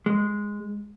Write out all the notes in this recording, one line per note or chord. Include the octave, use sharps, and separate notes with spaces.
G#3